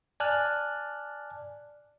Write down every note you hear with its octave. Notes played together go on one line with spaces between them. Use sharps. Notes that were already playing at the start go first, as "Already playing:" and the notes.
D5 G#5 A5 F6 F#6